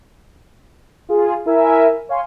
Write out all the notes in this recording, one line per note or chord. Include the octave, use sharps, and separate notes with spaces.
F4 G#4
E4 A#4 E5 G#5
C#5 F5 G#5 C6